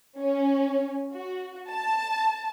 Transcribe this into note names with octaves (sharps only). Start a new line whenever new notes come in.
C#4
F#4
A5